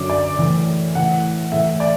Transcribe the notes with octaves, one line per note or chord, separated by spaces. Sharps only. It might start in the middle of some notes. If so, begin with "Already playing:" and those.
Already playing: F#2 D3 F#3 D6
D5
A2 E3
A2 E3 F#5
A2 E3 E5
D5